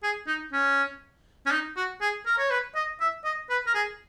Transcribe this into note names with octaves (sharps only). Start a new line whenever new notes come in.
G#4
D#4
C#4
C#4
D#4
F#4
G#4
A#4
C#5
B4
D#5
E5
D#5
B4
A#4
G#4